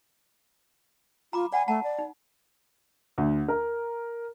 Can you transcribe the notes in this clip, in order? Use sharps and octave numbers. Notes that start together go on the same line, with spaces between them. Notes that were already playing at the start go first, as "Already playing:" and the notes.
F4 A#5 B5 D6
D5 F#5 G#5 B5
A3 F#5 A5 A#5
D5
D#4
D2
A#4